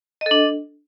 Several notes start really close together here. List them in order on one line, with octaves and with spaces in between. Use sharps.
D#5 A4 D4